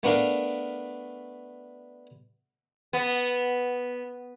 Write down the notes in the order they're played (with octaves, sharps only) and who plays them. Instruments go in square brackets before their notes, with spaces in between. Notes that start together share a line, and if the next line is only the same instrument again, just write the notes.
[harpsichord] A3 B3 D4 A#4 F5
[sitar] B3